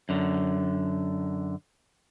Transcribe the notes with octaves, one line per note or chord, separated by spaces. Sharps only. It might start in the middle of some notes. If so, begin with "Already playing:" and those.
F#2 D3